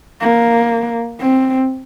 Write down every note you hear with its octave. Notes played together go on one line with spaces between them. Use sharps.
A#3
C4